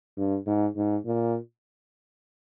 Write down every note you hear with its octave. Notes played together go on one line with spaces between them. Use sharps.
G2
G#2
G#2
A#2